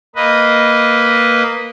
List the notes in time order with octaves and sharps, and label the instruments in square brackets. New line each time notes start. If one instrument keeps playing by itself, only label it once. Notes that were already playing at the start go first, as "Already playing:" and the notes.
[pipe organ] A#3 B4 D#5